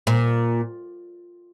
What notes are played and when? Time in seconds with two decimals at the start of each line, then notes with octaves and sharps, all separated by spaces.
0.07 A#2